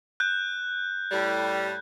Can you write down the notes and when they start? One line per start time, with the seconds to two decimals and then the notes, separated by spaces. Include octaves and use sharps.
0.20 F#6 G6
1.11 A2 G3